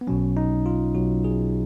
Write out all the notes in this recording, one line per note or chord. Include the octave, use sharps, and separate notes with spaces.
B3
B1 B2 F#3 C#4
D#4
F4
B1 B2 F#3 F#4
G#4